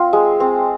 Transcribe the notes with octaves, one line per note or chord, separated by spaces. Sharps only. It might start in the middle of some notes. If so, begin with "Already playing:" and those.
Already playing: C4 F4
G#3
C4